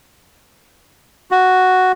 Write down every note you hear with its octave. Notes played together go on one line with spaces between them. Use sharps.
F#4